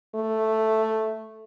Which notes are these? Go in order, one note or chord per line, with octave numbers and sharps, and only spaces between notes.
A3